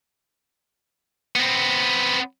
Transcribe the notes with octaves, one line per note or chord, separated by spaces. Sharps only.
B3 C4